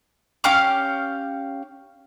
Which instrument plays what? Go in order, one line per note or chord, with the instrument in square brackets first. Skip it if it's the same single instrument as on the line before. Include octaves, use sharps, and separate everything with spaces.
[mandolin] C#4 G4 F5 D6